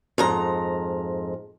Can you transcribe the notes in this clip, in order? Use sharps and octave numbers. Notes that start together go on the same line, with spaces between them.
F2 G#2 A#5